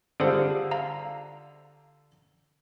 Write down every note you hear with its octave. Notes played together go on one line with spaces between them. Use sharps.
D3 G3 F4 G#4 A4 C5
F5 A#5